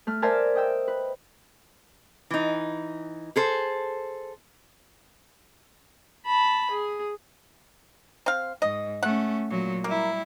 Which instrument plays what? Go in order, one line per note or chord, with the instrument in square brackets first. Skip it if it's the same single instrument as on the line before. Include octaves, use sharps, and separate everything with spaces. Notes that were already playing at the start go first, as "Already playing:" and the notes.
[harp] A3 F6
A#4 C5 D5 E5 G#5 A5
D#5 G5 E6
B4
[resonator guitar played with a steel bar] E3 D#4
G#4 A4 C5
[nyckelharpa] A5 B5
G#4
[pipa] C4 F5
[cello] G#2 [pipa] D#5
[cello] A3 C#4 [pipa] F#5
[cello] A#2 F#3
[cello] G3 E4 [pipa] A#3